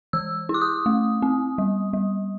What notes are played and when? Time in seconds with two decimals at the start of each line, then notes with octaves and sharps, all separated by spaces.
0.13 E3 E6
0.49 E4
0.54 D6
0.61 D#6
0.86 A3
1.22 C4
1.58 G3
1.93 G3